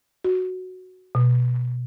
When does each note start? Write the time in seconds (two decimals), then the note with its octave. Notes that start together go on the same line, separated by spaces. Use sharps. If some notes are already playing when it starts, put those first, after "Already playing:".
0.24 F#4
1.15 B2